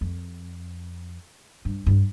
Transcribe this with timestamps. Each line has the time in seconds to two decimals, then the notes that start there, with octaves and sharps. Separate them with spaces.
0.01 F2
1.65 G2
1.87 G2